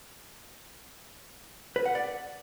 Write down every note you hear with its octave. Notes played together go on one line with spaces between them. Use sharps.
B4
F#5
D5